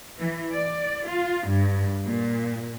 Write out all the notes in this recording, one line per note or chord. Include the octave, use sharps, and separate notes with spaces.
E3
D5
F4
G2
A#2